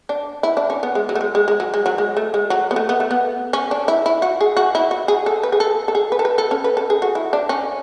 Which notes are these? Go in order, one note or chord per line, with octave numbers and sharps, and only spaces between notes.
D4
E4
D4
C#4
B3
G#3
F#3
A3
G#3
G#3
G#3
F#3
G#3
F#3
G#3
A3
G#3
F#3
B3
A3
B3
A3
B3
C#4
D4
E4
E4
F#4
G#4
F#4
E4
F#4
G#4
A4
B4
G#4
A4
A4
G#4
B4
A4
B4
A4
C#4
B4
A4
G#4
F#4
E4
D4
C#4